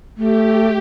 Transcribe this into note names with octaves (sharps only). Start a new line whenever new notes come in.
A3 G4